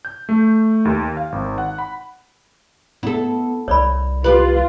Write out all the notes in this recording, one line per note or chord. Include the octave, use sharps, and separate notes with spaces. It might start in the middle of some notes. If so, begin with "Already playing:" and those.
G6
A3
D#2
F5
G#1
F#5
B5
B3 E4 A4
C2 C#5 D5 B5
F4 G4 B4